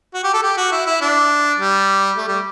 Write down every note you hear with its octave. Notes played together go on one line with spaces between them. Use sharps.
F#4
G4
A4
G4
F#4
E4
E4
D4
G3
A3
G3